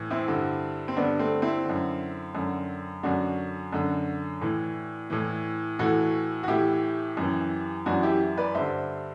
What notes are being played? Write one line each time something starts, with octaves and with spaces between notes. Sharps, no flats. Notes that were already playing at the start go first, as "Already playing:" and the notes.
Already playing: A2 E3
C4 E4
G2 D3
C4
G2 D3 B3 D4
A3 C4
C4 E4
F#2 D3
F#2 D3
F#2 D3 D4 F#4
F#2 D3
A2 E3
A2 E3
A2 E3 F#4 A4
F#4
A2 E3 E4 G4
F#2 E3
F#2 E3 D4 F#4
E4 G4
B4 D5
G2 D3 C5 E5